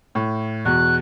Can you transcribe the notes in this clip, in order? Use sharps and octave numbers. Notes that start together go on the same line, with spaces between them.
A2
E2 B2 F#6